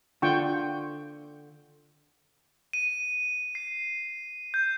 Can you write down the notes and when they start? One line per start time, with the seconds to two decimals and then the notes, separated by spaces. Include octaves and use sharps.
0.22 D3 F4 G5 C#6
2.73 D#7
3.55 C7
4.54 G6